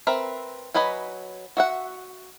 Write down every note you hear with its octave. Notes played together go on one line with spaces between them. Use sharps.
C4 A#4 B4 E5
F#3 B4 D#5 G#5 B5
F#4 E5 F#5